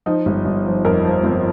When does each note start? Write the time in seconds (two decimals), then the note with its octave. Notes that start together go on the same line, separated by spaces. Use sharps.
0.06 F3 D#4
0.26 G1
0.45 G1
0.66 F3
0.85 F2 A#4
1.04 F3
1.24 G1 C4